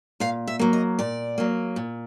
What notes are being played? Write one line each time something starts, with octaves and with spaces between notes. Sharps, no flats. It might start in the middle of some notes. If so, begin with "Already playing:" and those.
A#2 F5
E5
F#3 A#3
D#5
A#2 D5
F#3 A#3
A#2